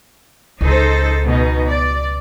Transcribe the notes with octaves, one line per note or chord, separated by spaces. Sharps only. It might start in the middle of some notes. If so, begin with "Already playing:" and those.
C#2 D#4 A4 C5
B2 D#4
D5